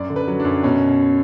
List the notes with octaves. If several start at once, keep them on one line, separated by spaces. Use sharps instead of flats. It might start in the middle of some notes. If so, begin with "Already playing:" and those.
Already playing: F#2 D5
D3
B4
F#3
D4
F#2
B2 C#4